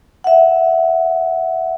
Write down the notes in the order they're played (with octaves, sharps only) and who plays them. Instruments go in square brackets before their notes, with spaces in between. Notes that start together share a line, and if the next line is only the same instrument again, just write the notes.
[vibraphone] E5 F#5